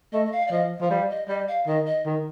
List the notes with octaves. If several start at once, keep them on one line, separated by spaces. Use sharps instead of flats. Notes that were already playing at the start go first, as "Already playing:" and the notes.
A3 D#5
D#5
F5
D5
F3 D#5
F3
G3 F5
D#5
G3 D#5
F5
D#3 D#5
D#5
D#3